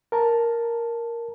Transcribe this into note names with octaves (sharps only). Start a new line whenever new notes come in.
A#4 A5 A#5